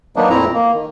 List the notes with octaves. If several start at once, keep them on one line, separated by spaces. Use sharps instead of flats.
D#3 F#3 A#3 B3 D4 D#4
F2 A#2 A3 C4 E4 A#5
A#3
D#3